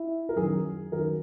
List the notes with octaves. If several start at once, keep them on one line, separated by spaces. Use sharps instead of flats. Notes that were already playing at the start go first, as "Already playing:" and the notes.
Already playing: E4
A#4
F#2 D#3 F#3 G#4
F#2 D#3 F#3 A#4